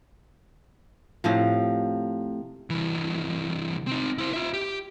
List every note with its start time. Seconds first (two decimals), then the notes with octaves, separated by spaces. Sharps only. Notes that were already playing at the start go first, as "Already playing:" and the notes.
1.24 A2 C3 F3
2.70 C2 E3
3.87 C4 D#4
4.18 E4 C5
4.34 F4 E5
4.53 G4